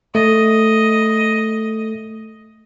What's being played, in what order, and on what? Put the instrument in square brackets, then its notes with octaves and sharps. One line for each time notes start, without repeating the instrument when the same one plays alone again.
[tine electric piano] A3 [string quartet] D#5